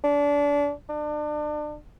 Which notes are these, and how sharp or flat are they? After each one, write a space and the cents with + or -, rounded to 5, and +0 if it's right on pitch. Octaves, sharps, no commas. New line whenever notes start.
D4 -30
D4 +30